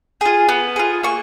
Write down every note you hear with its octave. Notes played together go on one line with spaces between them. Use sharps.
F4 G#4
B3
F4 G#4
A#3 C#6